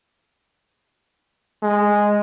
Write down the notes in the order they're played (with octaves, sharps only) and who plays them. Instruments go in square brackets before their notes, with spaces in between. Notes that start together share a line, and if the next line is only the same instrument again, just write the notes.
[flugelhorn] G#3